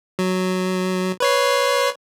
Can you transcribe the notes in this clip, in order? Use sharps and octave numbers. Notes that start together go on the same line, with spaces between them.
F#3
B4 C#5 C7